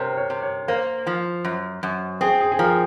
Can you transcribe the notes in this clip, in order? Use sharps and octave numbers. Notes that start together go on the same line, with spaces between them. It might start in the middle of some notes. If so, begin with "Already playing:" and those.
Already playing: C3 A#4 C5 C#5
C#5
C3
C#5
A#3 C5
F3
F#2
F#2
C4 G#4
G#4
G#4
F3 A#4